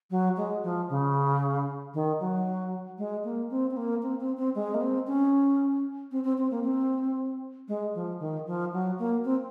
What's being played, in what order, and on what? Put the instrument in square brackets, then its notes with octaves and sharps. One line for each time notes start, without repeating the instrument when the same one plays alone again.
[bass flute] F#3
G#3
F3
C#3
D#3
F#3
G#3
A#3
C4
C4
A#3
C4
C4
C4
G#3
A#3
C4
C#4
C4
C4
C4
A#3
C4
G#3
F3
D#3
F3
F#3
A#3
C4